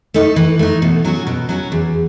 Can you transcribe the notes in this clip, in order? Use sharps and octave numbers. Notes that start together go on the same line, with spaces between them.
A3 D#4
E3
A3 D#4
B2
F#3 C#4 F#4
B2
F#3 C#4 F#4
E2